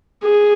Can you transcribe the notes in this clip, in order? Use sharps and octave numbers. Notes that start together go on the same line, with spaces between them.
G#4